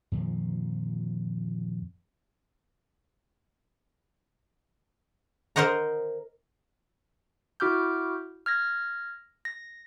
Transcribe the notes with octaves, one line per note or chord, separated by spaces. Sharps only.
F2 A#2 D#3 F3
A#4 C5 D#5 F#5 A#5
E4 F#4 D6 F6 G6
F6 G#6 A#6
A#6